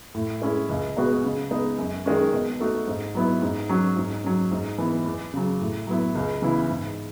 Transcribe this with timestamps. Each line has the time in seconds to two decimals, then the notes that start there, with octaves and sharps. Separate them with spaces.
0.15 A2
0.42 G#3 C#4 E4
0.69 C#2
0.97 B2 G#3 B3 F#4
1.24 C#3
1.51 G#3 B3 D#4
1.78 F#2
2.06 D#3 G#3 C#4
2.33 B2
2.60 A3 D#4 F#4
2.87 G#2
3.15 F#3 B3 E4
3.42 G#2
3.69 F#3 C#4 F#4
3.97 G#2
4.24 F#3 C#4
4.51 G#2
4.78 E3 B3
5.06 E2
5.34 C#3 F#3
5.60 A2
5.87 F#3 B3 E4
6.15 C#2
6.42 C#3 E3 B3 E4
6.70 G#2